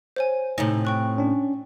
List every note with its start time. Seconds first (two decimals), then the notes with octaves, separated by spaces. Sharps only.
0.16 C5 C#5 G#5
0.58 A2 C3 D#4 G#5
0.85 G5 C#6 F#6
1.18 C#4 D4